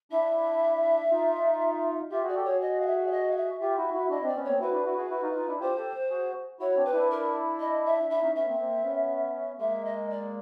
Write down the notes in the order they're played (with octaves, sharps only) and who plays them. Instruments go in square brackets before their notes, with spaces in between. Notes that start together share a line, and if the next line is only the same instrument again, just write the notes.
[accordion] D4 E4 [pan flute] E5
[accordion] D#4 F4
[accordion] F4 G4 [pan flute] E5
[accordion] F#4 G#4 [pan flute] D5
[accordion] G4 A4
[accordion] F#4 G#4 [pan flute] C#5
[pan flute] D#5
F5
E5
D5
D#5
F5
E5
[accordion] F4 G4 [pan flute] E5
[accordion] E4 F#4
E4 F#4
[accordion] D4 E4 [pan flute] D#5
[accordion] C4 D4 [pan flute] D5
[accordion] B3 C#4
[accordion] A#3 C4 [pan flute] C#5
[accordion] E4 F#4 [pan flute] B4
[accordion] D4 E4
E4 F#4
F#4 G#4
E4 F#4
D#4 F4
D#4 F4
D4 E4
[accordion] F4 G4 [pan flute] C5
[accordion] G4 A4
F#4 G#4
[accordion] E4 F#4 [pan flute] C#5
[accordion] C4 D4
[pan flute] B4
[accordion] D4 E4
[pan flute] A#4
D#5
E5
[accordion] D4 E4 [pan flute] E5
[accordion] C#4 D#4
[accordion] B3 C#4 [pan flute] E5
[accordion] A#3 C4
A#3 C4
B3 C#4
[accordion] G#3 A#3 [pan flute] E5
[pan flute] D#5
D5